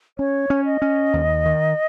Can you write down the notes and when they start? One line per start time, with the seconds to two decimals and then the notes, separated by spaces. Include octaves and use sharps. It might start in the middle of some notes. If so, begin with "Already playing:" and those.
0.18 C#4 C#5
0.50 C#4
0.66 D#5
0.82 C#4
1.13 D#2
1.46 D#3